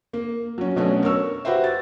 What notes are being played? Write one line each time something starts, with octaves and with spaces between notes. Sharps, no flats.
A#3
F#3 C#4
B2 F#3 A3 C#4 D4
A#4 C#5 C#6 E6
F#4 G4 B4 C5 E5
A6